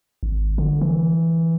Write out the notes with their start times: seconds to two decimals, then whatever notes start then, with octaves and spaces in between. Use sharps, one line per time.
0.23 G#1
0.58 D3
0.81 E3